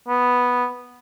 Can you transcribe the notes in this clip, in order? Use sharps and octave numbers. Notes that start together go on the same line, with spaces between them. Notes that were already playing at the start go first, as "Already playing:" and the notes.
B3